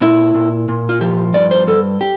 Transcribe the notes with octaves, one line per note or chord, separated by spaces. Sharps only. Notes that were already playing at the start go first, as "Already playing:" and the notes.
A#2 E4
A#2
A#2
F4
F3 G4
G2 D5
C5
G2 A4
G4